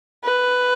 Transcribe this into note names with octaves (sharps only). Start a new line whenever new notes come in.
B4